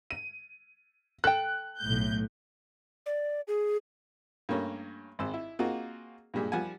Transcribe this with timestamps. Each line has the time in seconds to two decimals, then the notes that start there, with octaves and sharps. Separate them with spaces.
0.11 D#7
1.24 A4 G5 F#6
1.81 B1 A2 G6
3.06 D5
3.48 G#4
4.49 G2 A3 A#3 C#4
5.19 G#1 C4 E6
5.34 E4
5.59 A#3 C4 D#4 F4 F#4 G#4
6.34 G2 A#2 G3 G#3
6.52 F3 G3 F#5 G#5